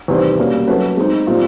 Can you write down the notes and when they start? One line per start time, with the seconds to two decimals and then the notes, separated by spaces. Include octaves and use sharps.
0.08 E2 C3 D#3 G3 C4
0.38 B2 G3 A#3 C#4
0.68 F#3 A3 C#4 F#4 B4
0.97 G#3 C4 D#4
1.27 A#2 G3 C4